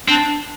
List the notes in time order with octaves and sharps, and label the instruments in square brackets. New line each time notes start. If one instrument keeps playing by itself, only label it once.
[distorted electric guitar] C4 [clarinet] D4